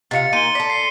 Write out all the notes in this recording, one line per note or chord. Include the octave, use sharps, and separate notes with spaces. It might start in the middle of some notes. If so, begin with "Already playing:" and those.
C3 F4 D#5 F5 A6 C#7
A#3 D#4 G#5 C6 D#7 G7
A4 D5 B6
C7